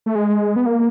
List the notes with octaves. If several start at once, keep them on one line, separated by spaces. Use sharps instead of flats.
A3
G#3
B3
A#3